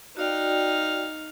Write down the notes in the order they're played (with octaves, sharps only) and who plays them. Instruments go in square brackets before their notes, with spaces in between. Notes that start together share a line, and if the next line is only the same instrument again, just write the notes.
[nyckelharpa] D#4 F5 [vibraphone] F#4 D5 G5